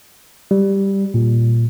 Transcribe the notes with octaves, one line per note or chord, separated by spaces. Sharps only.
G3
A#2